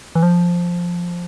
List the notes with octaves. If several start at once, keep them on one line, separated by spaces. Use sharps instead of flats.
E3
F3